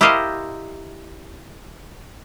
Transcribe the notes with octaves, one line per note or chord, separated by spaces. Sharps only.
E4 G4 A#4 C5 D#5 F5